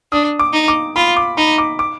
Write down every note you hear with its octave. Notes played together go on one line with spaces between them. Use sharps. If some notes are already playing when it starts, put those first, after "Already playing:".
D4 D#6
D6
D#4
D6
F4 B5
D6
D#4 B5
D6
D6